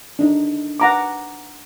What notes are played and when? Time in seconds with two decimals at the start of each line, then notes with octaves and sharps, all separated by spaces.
0.19 D4 D#4
0.80 F#5 A#5 D6